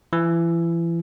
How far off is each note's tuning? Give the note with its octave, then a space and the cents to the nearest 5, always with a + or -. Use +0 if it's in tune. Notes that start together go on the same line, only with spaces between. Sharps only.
E3 +30